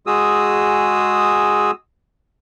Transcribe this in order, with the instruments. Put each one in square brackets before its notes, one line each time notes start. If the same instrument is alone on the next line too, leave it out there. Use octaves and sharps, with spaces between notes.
[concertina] G#3 F#4 G#4 D#6 E6